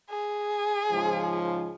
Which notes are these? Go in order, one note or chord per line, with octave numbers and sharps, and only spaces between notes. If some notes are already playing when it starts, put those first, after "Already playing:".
G#4
G#2 C#3 F3